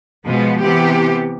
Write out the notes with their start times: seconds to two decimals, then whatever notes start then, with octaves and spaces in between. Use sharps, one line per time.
0.25 B2 F3 G#3 B3
0.61 C3 E3 B3 G4